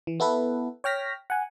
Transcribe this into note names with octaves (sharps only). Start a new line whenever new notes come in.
E3
B3 E4 A4 B4
C#5 G5 F6 A#6 B6
F#5 G#5